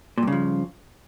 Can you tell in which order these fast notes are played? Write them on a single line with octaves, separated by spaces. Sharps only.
A#2 G2 C#3 F3